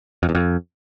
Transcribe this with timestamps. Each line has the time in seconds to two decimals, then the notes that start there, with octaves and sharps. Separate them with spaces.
0.23 F2
0.29 E2
0.35 F2